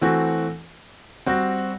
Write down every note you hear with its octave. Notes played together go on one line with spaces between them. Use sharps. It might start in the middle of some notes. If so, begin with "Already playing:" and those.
E3 A3 C4 F#4
G3 C4 F#4